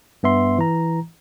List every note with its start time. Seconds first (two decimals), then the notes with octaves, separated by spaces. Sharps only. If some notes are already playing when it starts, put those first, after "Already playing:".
0.23 G2 B3 E5 C6
0.58 E3 A#5